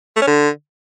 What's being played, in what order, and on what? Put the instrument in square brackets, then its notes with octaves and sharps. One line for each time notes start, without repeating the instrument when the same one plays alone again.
[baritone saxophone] A3
C#4
D3